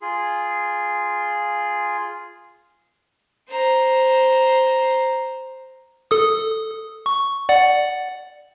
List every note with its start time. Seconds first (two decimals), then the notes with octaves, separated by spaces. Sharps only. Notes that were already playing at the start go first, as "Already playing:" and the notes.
0.02 F4 G#4
3.50 C5 A#5
6.11 A4 D#6
7.06 C#6
7.49 D5 F#5